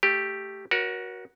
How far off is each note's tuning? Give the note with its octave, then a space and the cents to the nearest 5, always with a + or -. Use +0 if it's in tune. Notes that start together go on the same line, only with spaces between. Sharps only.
A3 +0 G4 +0
F#4 +0 A#4 +35 C#5 +15